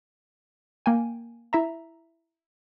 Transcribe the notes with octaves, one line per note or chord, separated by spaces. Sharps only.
A#3 G5 G#5
E4 E5 A#5